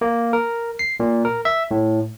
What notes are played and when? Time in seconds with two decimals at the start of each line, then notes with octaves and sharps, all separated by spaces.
0.01 A#3
0.33 A#4
0.79 C7
1.00 A#2
1.25 A#4
1.45 E5
1.71 A2